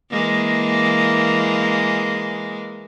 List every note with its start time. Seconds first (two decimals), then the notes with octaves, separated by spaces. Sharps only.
0.11 E3 G#3 A#3